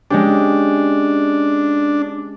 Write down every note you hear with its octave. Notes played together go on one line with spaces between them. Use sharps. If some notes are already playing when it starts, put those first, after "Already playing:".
G#3 C#4 D4 G4